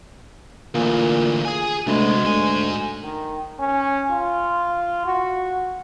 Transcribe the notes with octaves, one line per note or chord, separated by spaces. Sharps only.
D2 A#2 E3
G#4 G#5
D2 C3 G#3 B3
D2 G#2 G#5
D#3
C#4
F4
F#4